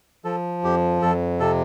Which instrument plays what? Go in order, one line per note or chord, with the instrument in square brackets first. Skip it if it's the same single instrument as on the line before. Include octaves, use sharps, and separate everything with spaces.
[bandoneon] F3 A4
F2 G4
F2 A4
C3 A4